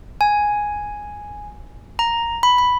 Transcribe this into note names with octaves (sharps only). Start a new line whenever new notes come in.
G#5
A#5
B5
B5